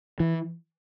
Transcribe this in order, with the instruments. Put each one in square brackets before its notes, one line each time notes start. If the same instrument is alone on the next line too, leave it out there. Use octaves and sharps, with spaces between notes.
[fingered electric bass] E3